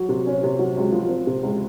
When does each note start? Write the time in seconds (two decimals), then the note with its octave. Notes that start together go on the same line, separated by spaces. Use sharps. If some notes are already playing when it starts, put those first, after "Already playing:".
Already playing: F#3
0.09 C3
0.27 C#4
0.43 C3
0.59 F#3
0.77 C#2
0.92 F3
1.09 C4
1.27 C3
1.43 C#2